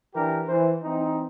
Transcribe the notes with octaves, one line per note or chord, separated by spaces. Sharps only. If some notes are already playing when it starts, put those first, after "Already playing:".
E3 D4 G4 A#4
E3 C5
E3 C4 D#4